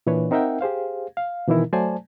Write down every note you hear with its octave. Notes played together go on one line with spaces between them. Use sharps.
A#2 E3 D4 B4 C#5
C4 D#4 A#4 E5 F#5 G5
G4 G#4 C5 F5
F5
B2 D#3 E3 D#4 E4 A#4
F#3 A3 C5 D5 G#5 A5